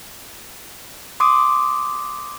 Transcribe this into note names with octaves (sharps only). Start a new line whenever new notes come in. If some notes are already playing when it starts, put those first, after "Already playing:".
C6 D6 D#6